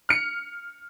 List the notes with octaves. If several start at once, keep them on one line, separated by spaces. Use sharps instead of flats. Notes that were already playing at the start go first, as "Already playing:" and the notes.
F6 C#7